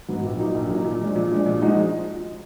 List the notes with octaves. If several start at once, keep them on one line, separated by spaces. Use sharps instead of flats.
G#2 F#3 B3
A#1
A#2 F#3 A#3 D#4
A#1
A#2 F#3 A#3 D#4
A#2
F3 G#3 D4
A#2
F3 G#3 D4
A#2
F3 G#3 D#4 F#4